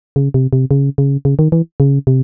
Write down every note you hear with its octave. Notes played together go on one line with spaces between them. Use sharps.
C#3
C3
C3
C#3
C#3
C#3
D#3
E3
C#3
C3